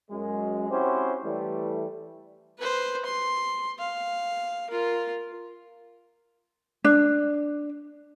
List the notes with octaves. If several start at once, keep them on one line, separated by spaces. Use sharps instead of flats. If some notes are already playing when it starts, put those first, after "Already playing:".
F#2 G#3
C4 C#4 E4 F#4 G4 C5
E3 G3 A3
B4 C5
C6
F5
F4 A#4
D4